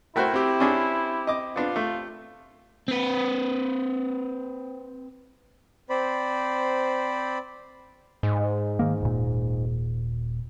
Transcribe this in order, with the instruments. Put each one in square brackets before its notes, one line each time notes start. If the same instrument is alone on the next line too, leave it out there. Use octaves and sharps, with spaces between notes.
[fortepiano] A3 F#4 C5 [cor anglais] E4 [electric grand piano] A#4 G5
[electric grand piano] C4 G4
[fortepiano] C#4 D4 G#4
D#5 D6
[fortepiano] B3 D4 [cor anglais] F4
[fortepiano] A3
[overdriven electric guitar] C4 B4
[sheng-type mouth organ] C4 C5 D5 B5
[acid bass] G#2
[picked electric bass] D#3 A#3
D#1 A#2